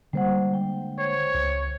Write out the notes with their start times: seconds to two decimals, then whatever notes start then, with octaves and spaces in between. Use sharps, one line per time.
0.13 D3 G3 G#3 A#3 C5 F#5
0.54 G5
0.98 C5 C#5
1.34 C#2